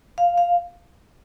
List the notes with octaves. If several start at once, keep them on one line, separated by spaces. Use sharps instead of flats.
F5
F5